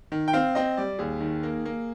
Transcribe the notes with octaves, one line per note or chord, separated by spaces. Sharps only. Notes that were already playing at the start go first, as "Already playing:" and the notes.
D#3
G5
C4 F5
C4 D#5
G3 D5
D#2 G#4
D#3
A#3
A#3